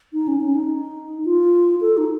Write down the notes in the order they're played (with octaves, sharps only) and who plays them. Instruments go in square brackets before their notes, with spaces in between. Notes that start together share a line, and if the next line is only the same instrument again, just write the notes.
[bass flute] D#4
C#4
C#4
D#4
F4
A4
D#4